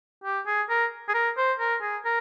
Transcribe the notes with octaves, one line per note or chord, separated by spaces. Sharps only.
G4
G#4
A#4
G#4
A#4
C5
A#4
G#4
A#4